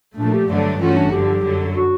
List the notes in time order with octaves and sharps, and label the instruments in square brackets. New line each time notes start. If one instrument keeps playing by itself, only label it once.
[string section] A#2 F3 A3 [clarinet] D4
[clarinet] G4
[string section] G2 D3 F#3 A3 D4
[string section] G2 E3 A3 C#4 F#4 [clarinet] F4
[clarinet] D4
[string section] G1 G2 D3 F3 [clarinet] G4
[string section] F#2 D3 F#3
[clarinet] F#4